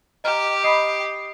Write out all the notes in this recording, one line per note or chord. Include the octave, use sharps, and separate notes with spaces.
G4 D#5 A#5 F6
D#5 B5 D#6 C7